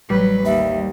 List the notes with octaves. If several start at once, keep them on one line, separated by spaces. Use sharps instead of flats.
A1 F#3 G3 B4
D#2 E5